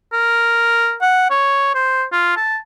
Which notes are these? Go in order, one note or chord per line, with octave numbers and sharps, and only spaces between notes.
A#4
F#5
C#5
C5
F4
A5